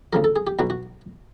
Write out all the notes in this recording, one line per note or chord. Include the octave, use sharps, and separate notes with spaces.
D2 C#3 F3 A#4
A4
G#4
G4
B1 B2 F#3 F#4
F#4